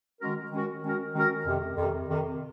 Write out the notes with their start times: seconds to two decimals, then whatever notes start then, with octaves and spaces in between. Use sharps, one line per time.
0.21 D#3 G#3 C#4 F#4 A#4
0.52 D#3 G#3 C#4 F#4 A#4
0.84 D#3 G#3 C#4 F#4 A#4
1.15 D#3 G#3 C#4 F#4 A#4
1.46 F2 C3 D#3
1.77 F2 C3 D#3
2.08 F2 C3 D#3